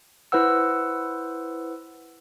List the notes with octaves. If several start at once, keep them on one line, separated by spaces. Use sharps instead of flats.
E4 B4 C5 F#5 E6